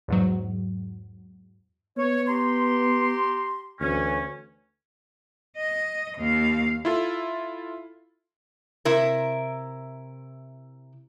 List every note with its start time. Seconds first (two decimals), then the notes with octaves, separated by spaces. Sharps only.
0.08 E2 G#2 F#3
1.98 B3 C#5
2.27 G4 A#5 C6
3.80 D2 E3 C#4
5.57 D#5
6.18 D#2 F5
6.85 E4 F4 A4
8.85 C3 E4 A#4